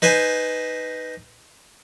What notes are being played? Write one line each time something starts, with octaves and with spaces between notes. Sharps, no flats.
D#4 B4 C5 G#5